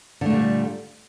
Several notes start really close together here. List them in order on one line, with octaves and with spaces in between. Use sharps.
D3 A3 A#2 G3